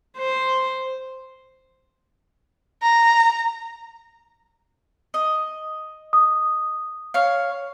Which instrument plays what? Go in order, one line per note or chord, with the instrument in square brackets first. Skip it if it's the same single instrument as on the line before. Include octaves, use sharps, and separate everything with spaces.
[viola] C5
[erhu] A#5
[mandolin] D#5
[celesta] D#6
[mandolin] C#5 F5